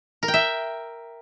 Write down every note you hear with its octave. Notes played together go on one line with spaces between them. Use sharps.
A#4
G5
E5